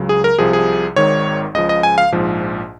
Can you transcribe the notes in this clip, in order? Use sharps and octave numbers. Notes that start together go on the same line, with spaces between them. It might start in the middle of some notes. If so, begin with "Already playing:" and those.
Already playing: C#2 C#3 F#3
G#4
A#4
C2 C3 F3 G#4
G#4
G#1 G#2 D#3 C#5
C#2 C#3 F3 D#5
D#5
G#5
F5
A#1 G#2 F3